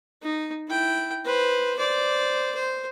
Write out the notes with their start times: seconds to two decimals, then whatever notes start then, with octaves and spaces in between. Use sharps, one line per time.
0.22 D#4
0.68 E4 G5
1.25 B4 C5
1.77 C5 D5
2.55 C5